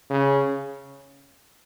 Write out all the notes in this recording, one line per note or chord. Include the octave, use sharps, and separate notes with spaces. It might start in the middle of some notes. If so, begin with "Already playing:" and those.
C#3